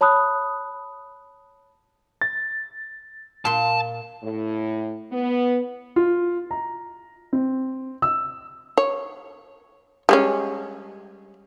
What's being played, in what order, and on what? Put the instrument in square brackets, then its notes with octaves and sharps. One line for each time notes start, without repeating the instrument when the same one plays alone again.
[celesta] C#5 A5 B5 D#6 F#6
[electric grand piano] A6
[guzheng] A#2 C6 [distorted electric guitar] A5
[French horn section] A2
B3
[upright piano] F4
A#5
C4
E6
[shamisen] C#5
G3 G#3 C#4